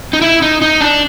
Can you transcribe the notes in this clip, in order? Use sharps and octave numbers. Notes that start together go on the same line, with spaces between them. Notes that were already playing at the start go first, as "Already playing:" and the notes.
D#4
E4
D#4
D#4
D4